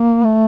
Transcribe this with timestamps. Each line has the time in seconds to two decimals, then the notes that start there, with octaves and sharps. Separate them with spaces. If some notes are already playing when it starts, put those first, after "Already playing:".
Already playing: A#3
0.24 A3